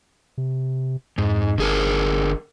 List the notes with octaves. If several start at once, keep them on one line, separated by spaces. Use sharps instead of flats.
C3
F2 G#2
G1 D3 G#4 A#4